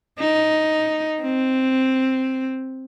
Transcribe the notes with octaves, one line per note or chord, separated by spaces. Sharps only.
D#4
C4